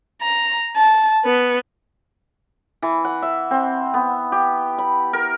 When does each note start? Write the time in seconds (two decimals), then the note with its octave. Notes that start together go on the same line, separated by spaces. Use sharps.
0.22 A#5
0.76 A5
1.25 B3
2.82 E3
3.05 F#5
3.22 E5
3.51 C4
3.94 B3
4.32 G4
4.78 B5
5.13 A#4